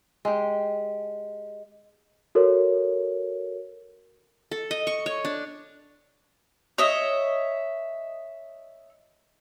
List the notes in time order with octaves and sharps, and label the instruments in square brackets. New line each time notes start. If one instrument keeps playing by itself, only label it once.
[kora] G#3 G4
[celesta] F#4 A4 A#4 C#5
[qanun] A4
D#5
C#6
C#5
D4
[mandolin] C#5 D#5 E5